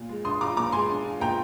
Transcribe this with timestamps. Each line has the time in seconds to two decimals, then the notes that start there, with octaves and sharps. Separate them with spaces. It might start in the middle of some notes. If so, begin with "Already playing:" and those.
Already playing: A#2 F4
0.09 G#3
0.24 D4 C6 D#6
0.41 F4 A#5 D6
0.56 A#2 A#5 D6
0.72 G#3 G#5 C6
0.88 D4
1.04 F4
1.20 A#2 G5 A#5